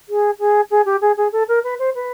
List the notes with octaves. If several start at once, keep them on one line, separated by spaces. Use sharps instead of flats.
G#4
G#4
G#4
G4
G#4
G#4
A4
A#4
B4
C5
B4